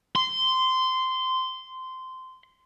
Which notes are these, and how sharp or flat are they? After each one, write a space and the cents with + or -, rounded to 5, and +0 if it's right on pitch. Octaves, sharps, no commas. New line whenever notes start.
C6 -15